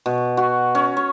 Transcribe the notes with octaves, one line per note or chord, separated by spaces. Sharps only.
B2
F#4
C#4
C#5